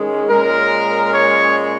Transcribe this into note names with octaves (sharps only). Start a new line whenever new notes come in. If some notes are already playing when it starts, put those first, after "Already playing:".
Already playing: D#3 G#3 C#4 G#4
A#2 G#3 C#4 A#4
C#5